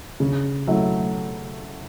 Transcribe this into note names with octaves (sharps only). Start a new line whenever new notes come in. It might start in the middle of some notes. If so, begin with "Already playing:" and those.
C#3
F#3 A3 E4